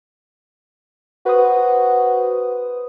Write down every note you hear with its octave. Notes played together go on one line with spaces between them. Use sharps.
F#4 B4 C5 D#6